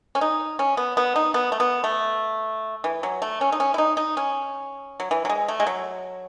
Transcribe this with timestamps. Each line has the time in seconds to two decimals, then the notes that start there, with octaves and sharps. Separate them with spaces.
0.15 C#4
0.21 D#4
0.59 C#4
0.77 B3
0.97 B3
1.16 D#4
1.34 B3
1.52 A3
1.60 B3
1.84 A3
2.84 E3
3.03 F#3
3.22 A3
3.41 C#4
3.52 D#4
3.60 C#4
3.74 E4
3.78 D#4
3.97 D#4
4.17 C#4
5.00 F#3
5.11 E3
5.25 F#3
5.29 G#3
5.48 A3
5.60 G#3
5.67 F#3